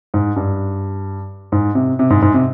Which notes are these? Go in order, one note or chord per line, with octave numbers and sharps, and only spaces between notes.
G#2
G2
G#2
C3
C3
G#2
G#2
C3